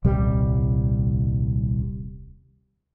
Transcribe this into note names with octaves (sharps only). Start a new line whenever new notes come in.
D#1 C2 G3